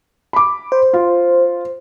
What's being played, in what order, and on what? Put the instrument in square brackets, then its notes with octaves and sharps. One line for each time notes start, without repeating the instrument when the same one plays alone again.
[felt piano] B5 D6
[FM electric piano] C5
[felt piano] F4